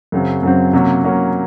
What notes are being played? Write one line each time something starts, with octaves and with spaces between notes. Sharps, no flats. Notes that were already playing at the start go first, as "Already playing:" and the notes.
F#2 C#3 F#3 C4
F#2 C#3 F#3 C4
C3 F#3 A#3 C#4
C3 F#3 A#3 C#4